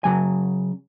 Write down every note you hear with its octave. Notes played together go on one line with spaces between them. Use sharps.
C#3 F#3 G#5